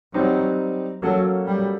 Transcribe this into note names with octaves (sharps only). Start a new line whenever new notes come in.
F#3 G3 C4 D#4
F#3 A#3 C#4 F#4 A4
G3